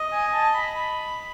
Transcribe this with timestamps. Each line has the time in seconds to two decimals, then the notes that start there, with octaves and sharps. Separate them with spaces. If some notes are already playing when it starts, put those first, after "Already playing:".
Already playing: D#5
0.11 G#5
0.33 A5
0.54 B5
0.75 B5